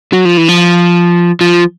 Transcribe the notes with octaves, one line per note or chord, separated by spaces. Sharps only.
F#3
F3
E3
F3
F3